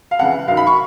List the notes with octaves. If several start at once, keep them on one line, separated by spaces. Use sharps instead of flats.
F5
F2 C#3 E3 F#5
F#2 D#3 F5
B5
C#6